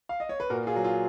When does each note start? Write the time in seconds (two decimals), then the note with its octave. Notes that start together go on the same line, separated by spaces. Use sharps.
0.09 F5
0.20 D#5
0.29 C#5
0.40 B4
0.50 A#2 F#4 A#4
0.67 F4 G#4
0.76 F#3
0.84 F4